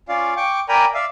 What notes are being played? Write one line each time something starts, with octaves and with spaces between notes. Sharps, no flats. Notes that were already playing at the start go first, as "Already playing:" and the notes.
C#4 F4 D5 F5
G5 C#6 D6
A#4 D5 G5 G#5 A#5 B5
D5 E5 F5